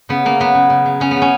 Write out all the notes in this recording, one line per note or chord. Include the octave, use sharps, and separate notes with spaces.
C#3 B3
C#3 A#3
F#3 B3
C#3
C#3
F#3
C#3 C#4
B3
C#3
C#4